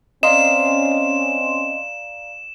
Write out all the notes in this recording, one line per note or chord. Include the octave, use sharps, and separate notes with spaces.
C4 C#4 D5 D#5 F5 A#5 C6 E7